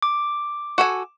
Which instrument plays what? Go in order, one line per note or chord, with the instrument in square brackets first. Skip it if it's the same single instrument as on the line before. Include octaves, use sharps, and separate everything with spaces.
[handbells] D6
[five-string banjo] F#4 A4 G#5